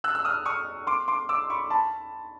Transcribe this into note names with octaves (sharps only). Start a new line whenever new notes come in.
E6 F#6
E6
D#6 F6
C#6 D#6
C6 D6
C6 D6
D6 E6
B5 C#6
A5 B5